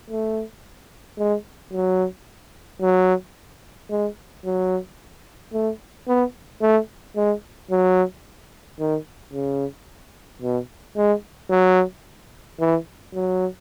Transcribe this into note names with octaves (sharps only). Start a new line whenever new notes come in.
A3
G#3
F#3
F#3
G#3
F#3
A3
B3
A3
G#3
F#3
D#3
C#3
B2
G#3
F#3
E3
F#3